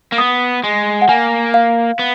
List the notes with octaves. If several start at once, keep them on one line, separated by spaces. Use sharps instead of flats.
A#3
B3 D#6
G#3
F#5
A#3 G#5
F5
B3